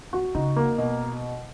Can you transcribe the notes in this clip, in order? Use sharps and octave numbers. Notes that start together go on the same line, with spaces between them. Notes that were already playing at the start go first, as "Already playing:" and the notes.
F#4
C#3 D#4
A#3
B2